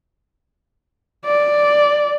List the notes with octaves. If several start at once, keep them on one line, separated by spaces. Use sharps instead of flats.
D5